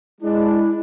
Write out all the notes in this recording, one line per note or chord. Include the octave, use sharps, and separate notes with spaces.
G#3 D4 E4